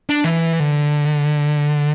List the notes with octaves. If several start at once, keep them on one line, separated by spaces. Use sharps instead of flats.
D4
E3
D3